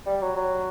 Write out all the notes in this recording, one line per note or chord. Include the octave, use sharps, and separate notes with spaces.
G3
F#3
F#3